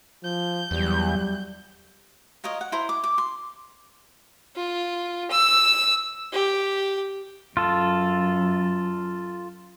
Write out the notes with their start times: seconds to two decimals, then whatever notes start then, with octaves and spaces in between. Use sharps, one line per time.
0.24 F3 G6
0.71 E2 F#3 G3
2.44 F4 A#4 C#5 D#5
2.61 F#5
2.72 E4 C5 A#5 C6
2.89 D6
3.04 D6
3.18 C6
4.56 F4
5.31 E6
6.33 G4
7.57 F#2 F4 A4